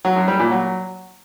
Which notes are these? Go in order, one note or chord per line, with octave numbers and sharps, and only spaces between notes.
F#3
F#2
G3
A#2
F#3